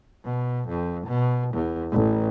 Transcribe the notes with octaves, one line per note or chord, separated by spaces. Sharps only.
B2
F2
B2
E2
A1